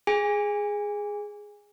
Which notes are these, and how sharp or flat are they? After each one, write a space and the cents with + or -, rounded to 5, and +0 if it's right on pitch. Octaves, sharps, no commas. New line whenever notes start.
G#4 +0 G#5 -25